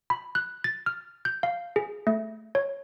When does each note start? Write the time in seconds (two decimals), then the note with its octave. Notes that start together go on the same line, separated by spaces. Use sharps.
0.10 B5
0.35 F#6
0.64 A6
0.86 F6
1.25 G6
1.43 F5
1.76 G#4
2.07 A3
2.55 C#5